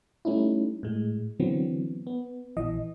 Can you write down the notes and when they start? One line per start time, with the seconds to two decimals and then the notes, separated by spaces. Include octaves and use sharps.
0.25 G3 A3 C#4 D#4 E4
0.83 A2 G#3
1.40 D3 E3 F#3 B3 C4
2.07 B3
2.57 A#1 E3 D#5